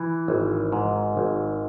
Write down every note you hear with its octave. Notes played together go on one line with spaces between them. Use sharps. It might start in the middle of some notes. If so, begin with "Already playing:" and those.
Already playing: E3
G#1
G#2
G#1